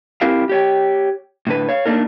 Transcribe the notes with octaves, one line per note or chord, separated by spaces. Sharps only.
C4 E4 G4 A#4 F5
G4 C#5 G5
A2 D3 B4
C#5 F5
A3 A#3 D4 D#4 A#4